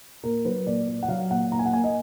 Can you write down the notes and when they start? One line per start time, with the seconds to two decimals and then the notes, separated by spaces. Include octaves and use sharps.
0.23 A#2 A#4
0.45 F#3 B4
0.66 A#2 D5
0.87 A#2
1.03 F#5
1.08 F#3 F5
1.30 A#2 F#5
1.52 A#2 A#5
1.59 G#5
1.66 F#5
1.73 A#3 G#5
1.84 D#5